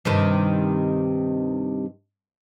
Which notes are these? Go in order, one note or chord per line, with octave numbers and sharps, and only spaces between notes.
G2 C3 D#3